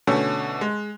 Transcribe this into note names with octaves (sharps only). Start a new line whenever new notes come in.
B2 D3 A3 C#4
G#3